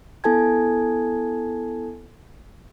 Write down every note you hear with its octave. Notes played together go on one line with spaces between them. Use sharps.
B3 E4 A4 G#5 A5 G#6